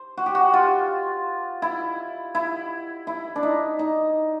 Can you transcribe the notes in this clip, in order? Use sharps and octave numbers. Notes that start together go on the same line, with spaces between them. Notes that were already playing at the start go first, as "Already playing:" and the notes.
Already playing: C5
F#4
G4
F#4
F4
E4
E4
E4
D4
D#4
D#4